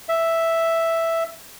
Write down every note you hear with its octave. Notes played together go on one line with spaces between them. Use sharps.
E5